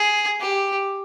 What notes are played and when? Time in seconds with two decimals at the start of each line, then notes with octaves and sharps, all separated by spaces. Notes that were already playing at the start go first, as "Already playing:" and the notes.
Already playing: G#4
0.41 G4